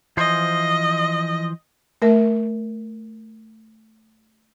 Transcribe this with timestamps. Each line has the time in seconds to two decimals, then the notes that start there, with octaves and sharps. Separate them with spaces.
0.17 E3 F3 C5 D#5
2.02 A3 A#4 E5